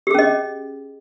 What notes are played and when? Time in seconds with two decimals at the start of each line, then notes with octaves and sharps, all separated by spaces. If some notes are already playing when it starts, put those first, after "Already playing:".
0.07 G4
0.11 G#4
0.15 C#4
0.19 D#5